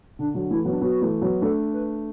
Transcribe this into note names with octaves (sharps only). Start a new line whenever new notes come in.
D3 D4
D3 F#3
E3 A3 E4
F#3 B3
D4
F#3 B3 F#4
E3 A3
F#3 B3
A3 D4 A4
B4